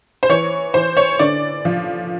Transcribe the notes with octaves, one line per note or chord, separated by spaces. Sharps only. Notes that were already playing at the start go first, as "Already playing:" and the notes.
C5
E3 C#5
E3 C5
C#5
D3 D5
F3